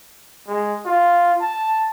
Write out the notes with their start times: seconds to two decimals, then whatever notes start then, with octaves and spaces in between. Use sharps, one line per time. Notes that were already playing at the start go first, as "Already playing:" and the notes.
0.48 G#3
0.85 F4
1.41 A5